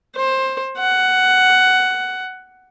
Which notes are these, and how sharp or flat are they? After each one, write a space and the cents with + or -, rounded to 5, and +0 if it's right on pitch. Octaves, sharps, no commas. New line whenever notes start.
C5 +15
F#5 +10